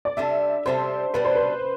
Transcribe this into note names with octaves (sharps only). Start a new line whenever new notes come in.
D5
C3 G3 D4 A4 E5
C3 G3 D4 A4 C5
B2 G3 D4 B4
C5
B4